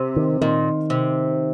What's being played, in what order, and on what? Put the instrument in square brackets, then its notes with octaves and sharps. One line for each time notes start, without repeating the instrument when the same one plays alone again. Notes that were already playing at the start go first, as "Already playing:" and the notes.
Already playing: [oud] C3
[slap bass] D#3
[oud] A#2 [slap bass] D#3
[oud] C3